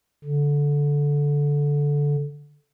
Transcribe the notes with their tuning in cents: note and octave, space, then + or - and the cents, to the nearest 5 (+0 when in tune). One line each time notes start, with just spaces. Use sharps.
D3 -15